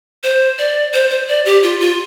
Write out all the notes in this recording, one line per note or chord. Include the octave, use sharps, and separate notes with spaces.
C5
D5
C5
C5
D5
G4
F4
F4